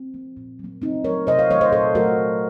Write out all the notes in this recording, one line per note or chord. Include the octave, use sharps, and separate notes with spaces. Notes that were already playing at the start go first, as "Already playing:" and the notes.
Already playing: C4
F3 A#3
A#2
F#3
A#3
C#3 C4 D#4
F#3 A3 A#4 C#5
C3 C5 D#5
C#5 F5
D#3 F#3 A3 C#5 F5
C5 D#5
A#2 A4 C5
F#3 A3 F#4 A#4
D#3